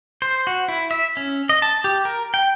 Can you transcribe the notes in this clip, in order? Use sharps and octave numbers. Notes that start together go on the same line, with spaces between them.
C5
F#4
E4
E5
C#4
D#5
A5
G4
A#4
G5